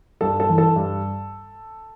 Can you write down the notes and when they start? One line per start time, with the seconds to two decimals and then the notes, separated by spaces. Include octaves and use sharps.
0.21 G2 A4
0.40 A4
0.49 E3
0.58 A4
0.76 G2